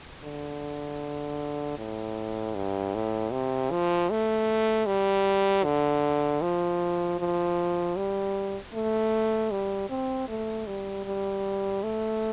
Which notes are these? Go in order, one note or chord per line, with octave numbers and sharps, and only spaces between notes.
D3
A2
G2
A2
C3
F3
A3
G3
D3
F3
F3
G3
A3
G3
C4
A3
G3
G3
A3